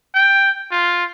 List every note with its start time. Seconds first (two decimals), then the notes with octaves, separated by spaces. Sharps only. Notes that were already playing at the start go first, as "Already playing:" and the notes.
0.15 G5
0.71 F4